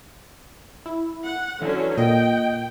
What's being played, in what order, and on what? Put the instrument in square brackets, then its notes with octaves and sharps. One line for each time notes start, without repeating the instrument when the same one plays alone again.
[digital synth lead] E4
[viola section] F#5
[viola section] D3 F#3 C#4 [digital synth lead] E3
[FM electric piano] A#2 [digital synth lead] D#5 [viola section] G5